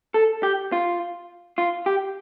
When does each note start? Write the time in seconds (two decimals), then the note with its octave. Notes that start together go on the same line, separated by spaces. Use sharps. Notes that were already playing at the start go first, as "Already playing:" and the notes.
0.14 A4
0.43 G4
0.72 F4
1.58 F4
1.86 G4